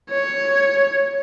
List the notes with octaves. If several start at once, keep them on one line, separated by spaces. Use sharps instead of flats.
C#5